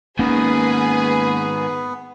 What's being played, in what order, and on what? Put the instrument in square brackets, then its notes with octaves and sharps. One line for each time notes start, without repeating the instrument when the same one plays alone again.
[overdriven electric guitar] G#2 D#3 [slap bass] A#3 C#4 [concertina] B3 [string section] G#4 B4